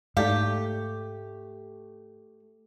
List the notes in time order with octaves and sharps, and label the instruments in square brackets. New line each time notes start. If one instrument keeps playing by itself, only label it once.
[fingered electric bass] G#2 [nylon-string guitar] A3 [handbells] D#4 D5 F5 [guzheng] G4